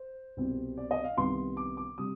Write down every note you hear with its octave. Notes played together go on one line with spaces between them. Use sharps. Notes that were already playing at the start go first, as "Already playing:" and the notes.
Already playing: C5
C2 B2 G3 C4
D5
D#5
F5
C2 C3 D#3 B3 C6
D6
D6
C3 G3 D#6